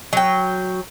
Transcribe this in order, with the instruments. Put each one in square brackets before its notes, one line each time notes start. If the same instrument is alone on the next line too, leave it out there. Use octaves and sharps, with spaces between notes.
[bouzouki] F#3 G5